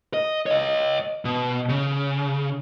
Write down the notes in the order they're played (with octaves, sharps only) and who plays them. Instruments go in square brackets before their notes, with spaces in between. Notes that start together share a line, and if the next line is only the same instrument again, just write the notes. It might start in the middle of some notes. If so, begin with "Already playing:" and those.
[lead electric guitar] D#5
C#5 D#5
B2
C#3